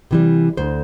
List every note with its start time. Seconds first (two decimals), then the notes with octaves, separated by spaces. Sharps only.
0.11 C3 E3 G3
0.57 D2 C5